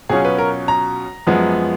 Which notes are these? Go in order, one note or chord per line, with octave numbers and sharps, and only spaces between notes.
B2 F#3 C#4 F4 G#4
B4
A#4
A#5
F#2 F3 G#3 B3